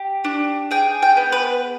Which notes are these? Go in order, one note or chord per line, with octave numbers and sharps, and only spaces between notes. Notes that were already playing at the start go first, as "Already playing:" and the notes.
Already playing: G4
D4
G#4 G5
G5
B3
B4